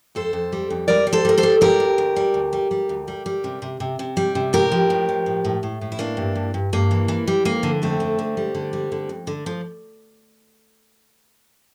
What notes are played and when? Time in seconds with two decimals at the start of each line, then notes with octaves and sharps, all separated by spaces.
0.15 F2 A4 C5
0.33 F2
0.52 G3
0.70 F2
0.88 G3 A#4 D5
1.07 G3
1.13 A4 C5
1.25 G3 A#4
1.37 A4 C5
1.43 G3
1.61 G3 G4 A#4
1.80 D2
1.98 D2
2.16 G3
2.34 D2
2.53 G3
2.71 G3
2.89 D2
3.08 G3
3.26 G3
3.44 C3
3.62 C3
3.80 C3
3.99 C3
4.17 G3
4.35 C3
4.53 A2 G4 A#4
4.72 F3
4.90 A2
5.09 F3
5.26 A2
5.45 A2
5.63 A2
5.81 A2
5.92 E4
5.99 E3 A#3 D4
6.17 G2
6.35 G2
6.54 G2
6.73 G2 A#3
6.91 E3
7.08 E3
7.27 G3
7.45 F2 A#3
7.63 D3
7.82 F2 A3 C4
8.00 D3
8.19 D3
8.37 G3
8.55 D3
8.73 G3
8.92 D3
9.09 F2
9.27 D3
9.46 F3